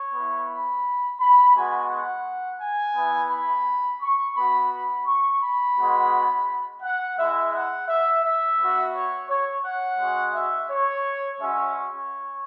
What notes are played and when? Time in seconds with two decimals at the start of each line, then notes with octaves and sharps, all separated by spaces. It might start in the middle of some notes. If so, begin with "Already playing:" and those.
Already playing: C#5
0.14 B3 E4
0.49 B5
1.19 B5
1.55 G#3 B3 F#4 G#5
1.89 F#5
2.60 G#5
2.95 B3 E4
3.30 B5
4.02 C#6
4.36 B3 F#4 B5
4.71 B5
5.06 C#6
5.41 B5
5.77 G#3 B3 F#4
6.82 F#5
7.18 G#3 E4 E5
7.53 F#5
7.88 E5
8.23 E5
8.59 B3 F#4
8.94 C#5
9.29 C#5
9.64 F#5
9.99 G#3 C#4 F#4
10.34 E5
10.69 C#5
11.40 G#3 C#4 F#4 E5
11.75 C#5